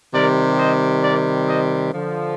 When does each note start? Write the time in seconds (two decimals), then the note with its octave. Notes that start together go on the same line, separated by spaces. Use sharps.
0.14 C3 D#3 G3 A#4 D5
0.59 C5 D#5
1.03 A#4 D5
1.48 C5 D#5
1.93 D3 F3